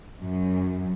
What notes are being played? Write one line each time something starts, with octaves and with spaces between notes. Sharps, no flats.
F#2